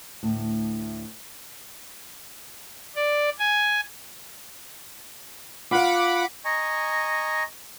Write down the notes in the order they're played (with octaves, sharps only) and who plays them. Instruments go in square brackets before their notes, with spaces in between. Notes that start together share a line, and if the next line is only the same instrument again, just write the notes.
[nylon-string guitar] D2 A2
[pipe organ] D5
G#5
[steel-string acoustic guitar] F4 F5 [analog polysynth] F#5 B5 D6
[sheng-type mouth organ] D#5 G#5 A#5 C#6